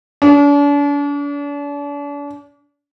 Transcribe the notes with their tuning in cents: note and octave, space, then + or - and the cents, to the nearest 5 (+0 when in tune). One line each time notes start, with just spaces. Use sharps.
D4 -40